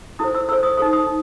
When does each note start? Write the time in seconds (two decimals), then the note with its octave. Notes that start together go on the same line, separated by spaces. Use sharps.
0.19 E4 A4 C5 D#6
0.35 E6
0.48 E4 A4 C5 E6
0.63 D#6
0.77 D#4 A4 C5 D#6
0.93 D#6
1.07 D#4